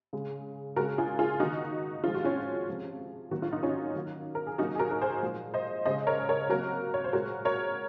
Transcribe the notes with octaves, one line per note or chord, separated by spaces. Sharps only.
C#3 G#3
C#3 G#3 F#4 A#4
F4 G#4
F4 G#4
D#3 A#3 D#4 F#4
C3 F3 G#3 F4
F#4
C#4 F4
C3 F3 G#3
D#3 F#3 A#3 F#4
F4
D#4
C#4 F4
D#3 F#3 A#3
A#4
G#4
C3 F#3 A#3 D#4 F#4
G#4
F#4 A#4
A#4
G#4 C5
A#2 F3 G#3
C5 D#5
C#3 G#3 C5 D#5
A#4 C#5
A#4 C#5
C3 F#3 A#3 F#4 A#4
C#5
C5
A#2 G#3 F#4 A#4
A#4 C#5